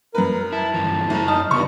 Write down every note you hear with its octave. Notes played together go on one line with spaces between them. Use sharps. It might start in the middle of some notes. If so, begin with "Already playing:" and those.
F#2 A#4 B4
E4 A5
G2 E3 F3
F#1 F#2 A#5
D#4 A5 D#6 F6
G2 C#3 B3 C#6